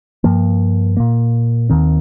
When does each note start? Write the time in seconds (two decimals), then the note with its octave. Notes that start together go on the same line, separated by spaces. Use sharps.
0.24 G2 F3 A#3
0.97 A#2 A#3
1.70 D#2 D#3 C4